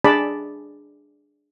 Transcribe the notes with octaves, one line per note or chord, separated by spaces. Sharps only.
D4 G#4 D5 A5 B5